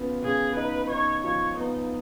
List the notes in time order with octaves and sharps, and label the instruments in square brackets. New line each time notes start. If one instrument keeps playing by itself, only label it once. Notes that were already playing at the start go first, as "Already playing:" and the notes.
Already playing: [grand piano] C#3 B3 F4
[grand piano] C#3 [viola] G#4
[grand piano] D#4 [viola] B4
[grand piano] D#4 [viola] C#5
[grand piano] F3 [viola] C#5
[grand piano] B3 [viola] D#4